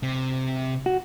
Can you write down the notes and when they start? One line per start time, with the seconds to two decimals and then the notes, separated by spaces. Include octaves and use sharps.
0.03 C3
0.86 F#4